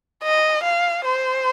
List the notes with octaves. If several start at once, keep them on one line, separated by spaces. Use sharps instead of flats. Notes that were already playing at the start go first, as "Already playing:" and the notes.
D#5
F5
C5